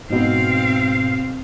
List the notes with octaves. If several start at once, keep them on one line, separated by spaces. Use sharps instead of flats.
G#2 B2 C4 F5